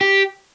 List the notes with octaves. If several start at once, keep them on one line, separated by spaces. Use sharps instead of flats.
G4